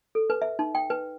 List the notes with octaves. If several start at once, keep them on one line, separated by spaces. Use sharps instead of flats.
A4
B4
E5
D#4
G5
B4